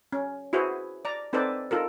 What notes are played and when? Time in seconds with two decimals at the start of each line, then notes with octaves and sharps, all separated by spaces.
0.13 C#4
0.53 E4 F#4 G#4 B4 C5
1.05 D5 A#5
1.33 C4 D#4 A4 B4 C5 D5
1.71 D#4 F4 A4 A#4